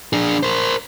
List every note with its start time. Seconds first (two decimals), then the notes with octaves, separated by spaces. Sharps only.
0.13 D4 G#4
0.43 A#4 C5